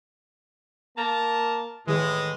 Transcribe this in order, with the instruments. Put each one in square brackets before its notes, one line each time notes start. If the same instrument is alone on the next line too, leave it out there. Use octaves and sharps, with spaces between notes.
[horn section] A#3 A#4 A5
[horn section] A2 E3 G#3 [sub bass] D#3